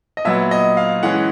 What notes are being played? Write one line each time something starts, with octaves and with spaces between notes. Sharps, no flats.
D#5
A#2 F#3 B3 E5
D#5
F5
E3 G#3 C#4 F#5